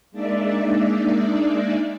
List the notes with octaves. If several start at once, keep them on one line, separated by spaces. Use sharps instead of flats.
G#3 A#3 D4 D#4 D5 E5